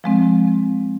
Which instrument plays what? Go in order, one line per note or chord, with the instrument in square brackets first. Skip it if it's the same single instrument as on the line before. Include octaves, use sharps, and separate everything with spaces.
[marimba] F3 G#3 C4